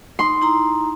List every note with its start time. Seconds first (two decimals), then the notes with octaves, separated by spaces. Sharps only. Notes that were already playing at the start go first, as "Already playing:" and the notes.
0.19 D#4 C6
0.41 D#4 E4 A#5